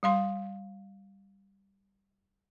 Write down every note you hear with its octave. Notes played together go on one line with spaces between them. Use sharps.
G3 F5 C6